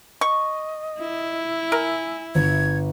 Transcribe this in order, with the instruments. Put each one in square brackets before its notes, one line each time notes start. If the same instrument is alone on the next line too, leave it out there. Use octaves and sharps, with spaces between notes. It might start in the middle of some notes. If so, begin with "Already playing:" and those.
[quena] D#5 [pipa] C#6
[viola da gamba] E4
[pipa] A#4 [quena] G#5
[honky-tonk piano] G1 [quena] G#6